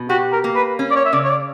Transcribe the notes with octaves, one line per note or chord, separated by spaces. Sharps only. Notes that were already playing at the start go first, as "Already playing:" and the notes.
Already playing: B2
F#4 G4
A#4
A#3
B4
C#4
D5
C#5
E5
C#3 D5
C#5
D5